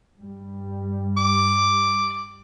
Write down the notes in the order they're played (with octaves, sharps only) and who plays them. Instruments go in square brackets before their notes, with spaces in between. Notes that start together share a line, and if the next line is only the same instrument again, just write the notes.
[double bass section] G2 G3
[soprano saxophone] D6